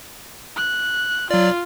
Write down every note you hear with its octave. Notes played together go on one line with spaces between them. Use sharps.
F#6
F#3 F4 D5